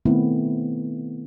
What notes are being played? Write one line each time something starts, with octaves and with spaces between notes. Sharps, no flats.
D#3 A3 B3 C4 E4